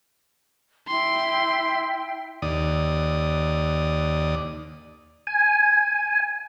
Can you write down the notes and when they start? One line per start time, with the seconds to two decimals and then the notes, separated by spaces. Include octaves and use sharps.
0.88 E4 G5 C6
2.42 D#2 D5 D#6
5.27 G#5